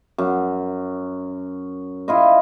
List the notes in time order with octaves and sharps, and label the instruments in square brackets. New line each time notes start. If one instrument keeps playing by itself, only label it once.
[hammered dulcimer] F#2
E4 F4 D#5